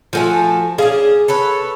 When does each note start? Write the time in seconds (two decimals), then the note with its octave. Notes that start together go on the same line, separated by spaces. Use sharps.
0.13 F3 A3 F#4 A4 G#5
0.78 C#4 D4 G#4 F5
1.28 A4 B4 C#5